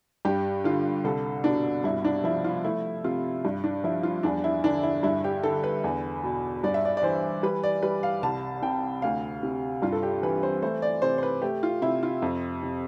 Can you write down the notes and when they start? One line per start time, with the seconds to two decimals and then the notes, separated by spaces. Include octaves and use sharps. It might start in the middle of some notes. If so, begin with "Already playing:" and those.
0.25 G2 G4
0.64 D3 F4
1.04 C2 A4
1.44 B2 D4
1.84 G2 E4
2.05 D4
2.24 F3 E4
2.44 F4
2.64 A3 E4
3.04 C3 F4
3.45 G2
3.64 D4
3.84 F3 E4
4.03 F4
4.23 E2 D4
4.44 E4
4.64 D3 D4
4.83 E4
5.03 G2 E4
5.24 G4
5.43 D3 A4
5.64 B4
5.84 E2
6.24 B2
6.63 G2 D5
6.74 E5
6.85 D5
6.97 D5
7.03 E3 C5
7.43 G3 B4
7.63 D5
7.83 G3 B4
8.03 F5
8.22 C2 A5
8.62 C3 G5
9.02 D2 F5
9.43 C3
9.82 G2 F4
9.93 A4
10.03 G4
10.23 E3 B4
10.43 C5
10.62 A3 C5
10.82 D5
11.02 C3 C5
11.18 C5
11.23 B4
11.42 A3 G4
11.63 F4
11.82 C3 E4
12.03 F4
12.22 F2
12.63 C3